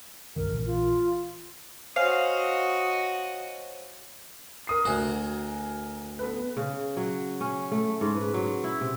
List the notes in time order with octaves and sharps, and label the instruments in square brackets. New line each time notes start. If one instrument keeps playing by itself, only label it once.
[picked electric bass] C2 G2 D#3 [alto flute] A#4
[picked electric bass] A#1 E3
[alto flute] F4
[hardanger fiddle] F#4 D#5 [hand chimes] C5 C#5 G#5 [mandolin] F5
[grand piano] A#4 D#6 C7
[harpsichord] D2 F#4 [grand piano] A#4 G#5
[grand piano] B3 A4 B4
[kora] C#3
F#3
C#4
A3
G#2
B4
F#3
E4
C3